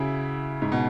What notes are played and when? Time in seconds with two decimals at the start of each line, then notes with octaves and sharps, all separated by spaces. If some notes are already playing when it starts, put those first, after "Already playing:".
Already playing: C#3 E4 F#4
0.62 G#2
0.72 B2